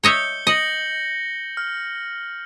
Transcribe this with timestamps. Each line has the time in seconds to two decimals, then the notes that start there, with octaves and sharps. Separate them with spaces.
0.04 C#5 D#5 E5 G6 C#7 G7
0.47 D#5 A#6 C#7 F#7
1.57 F6